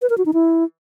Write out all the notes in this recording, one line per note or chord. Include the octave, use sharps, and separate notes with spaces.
B4
A#4
F#4
D#4
E4